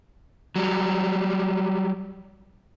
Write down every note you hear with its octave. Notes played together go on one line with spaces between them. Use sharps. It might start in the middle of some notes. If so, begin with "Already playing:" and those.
F#3 G3